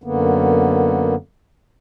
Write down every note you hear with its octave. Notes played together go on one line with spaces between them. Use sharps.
F#2 D3 A#3 B3